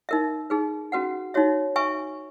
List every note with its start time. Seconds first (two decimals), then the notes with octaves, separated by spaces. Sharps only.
0.09 D#4 A#4 E5
0.50 D#4 G#4 B4
0.92 C#4 F#4 B4 F#5
1.34 D#4 F#4 C#5 E5
1.76 B4 E5 G#5 C#6